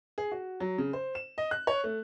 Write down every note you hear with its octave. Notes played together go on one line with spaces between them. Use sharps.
G#4
F#4
F#3
C#3
C5
E7
D#5
F#6
C#5
A3